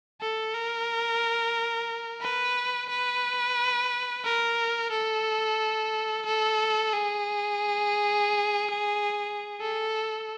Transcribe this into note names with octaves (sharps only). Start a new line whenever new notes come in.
A4
A#4
B4
B4
A#4
A4
A4
G#4
A4